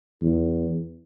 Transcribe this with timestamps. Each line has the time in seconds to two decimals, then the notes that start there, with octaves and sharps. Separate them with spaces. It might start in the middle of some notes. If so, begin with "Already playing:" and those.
0.22 E2